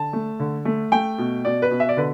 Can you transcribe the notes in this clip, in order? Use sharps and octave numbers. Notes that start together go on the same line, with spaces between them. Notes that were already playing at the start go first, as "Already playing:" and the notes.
Already playing: D3 A5
A3
D3
A3
A3 G5
B2
B2 D5
B4
B2
E5
D5
D3 B4